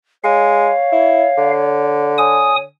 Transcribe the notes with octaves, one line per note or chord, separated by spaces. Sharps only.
G#3 C#5 F5
E4
D3
C#5 G#5 D#6